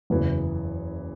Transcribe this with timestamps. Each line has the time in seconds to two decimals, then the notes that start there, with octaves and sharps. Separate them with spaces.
0.10 F#1 E2 E3